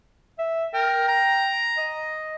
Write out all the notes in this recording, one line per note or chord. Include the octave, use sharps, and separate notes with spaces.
E5
A#4 G5
A#5
D#5